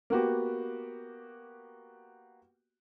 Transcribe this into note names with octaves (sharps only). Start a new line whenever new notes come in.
A#3 B3 F#4 G4